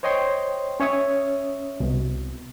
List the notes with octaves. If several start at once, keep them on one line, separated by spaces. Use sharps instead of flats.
C5 C#5 D#5 G5 C6
C#4 C#5 E5 D#6
C2 B2